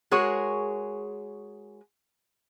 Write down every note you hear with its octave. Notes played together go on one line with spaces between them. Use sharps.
G#3 F#4 G#4 A#4 C#5